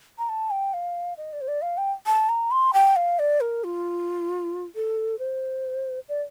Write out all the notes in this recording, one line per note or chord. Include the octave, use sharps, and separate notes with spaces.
A#5
A5
G5
F5
D#5
D5
C5
D5
F5
G5
A5
A#5
C6
G5
F5
D5
A#4
F4
A4
C5
D5